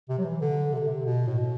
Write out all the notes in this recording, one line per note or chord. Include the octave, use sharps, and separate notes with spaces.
C3
F#3
E3
D3
C3
D3
C3
B2
A2
B2